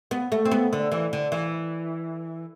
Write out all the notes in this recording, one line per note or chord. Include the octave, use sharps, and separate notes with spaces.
B3
A3
C4
B3
D3
E3
D3
E3